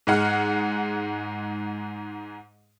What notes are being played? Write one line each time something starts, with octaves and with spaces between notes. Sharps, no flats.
G#2 G#3 F#5 F6